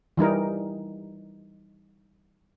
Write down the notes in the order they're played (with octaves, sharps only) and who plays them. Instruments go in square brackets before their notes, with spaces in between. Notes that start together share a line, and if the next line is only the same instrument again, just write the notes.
[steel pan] E3 G3 D#4 A#4